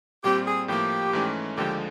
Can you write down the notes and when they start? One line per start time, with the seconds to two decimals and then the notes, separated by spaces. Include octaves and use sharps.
0.23 A#2 G3 C4 G4
0.46 G#4
0.68 A2 F3 A#3 G4
1.13 G#2 E3 A3 C#4
1.57 D#2 D3 F3 G#3 G4